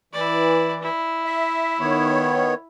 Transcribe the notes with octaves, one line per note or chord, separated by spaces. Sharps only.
E3 E4 D5
E4
E5
D#3 B3 C#5